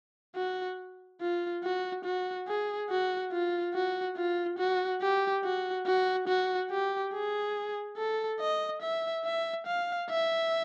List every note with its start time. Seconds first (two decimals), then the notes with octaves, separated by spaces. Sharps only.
0.36 F#4
1.21 F4
1.63 F#4
2.05 F#4
2.48 G#4
2.90 F#4
3.32 F4
3.74 F#4
4.17 F4
4.59 F#4
5.01 G4
5.44 F#4
5.86 F#4
6.28 F#4
6.71 G4
7.13 G#4
7.98 A4
8.40 D#5
8.82 E5
9.25 E5
9.67 F5
10.10 E5